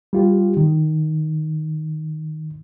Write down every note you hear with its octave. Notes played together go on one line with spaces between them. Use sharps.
G3 F4 G4
D#3